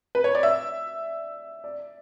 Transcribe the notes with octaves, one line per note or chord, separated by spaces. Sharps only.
B4
C#5
D5
E5
D5